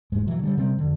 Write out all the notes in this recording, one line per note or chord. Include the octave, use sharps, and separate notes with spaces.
E1 G#2 G#3
B2 E3 F#3
D3 G3
C3 G3 C4 C#4
F2 D3